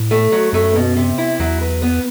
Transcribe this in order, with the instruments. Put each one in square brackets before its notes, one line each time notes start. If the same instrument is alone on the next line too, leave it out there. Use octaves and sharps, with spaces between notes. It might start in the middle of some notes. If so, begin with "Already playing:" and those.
Already playing: [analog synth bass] A2
[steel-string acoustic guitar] A3
F#3
[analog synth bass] F#2 [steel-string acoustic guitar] A3
[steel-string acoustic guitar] B2
C3
E4
[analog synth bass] E2 [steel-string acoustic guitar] F#3
[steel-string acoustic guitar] B4
B3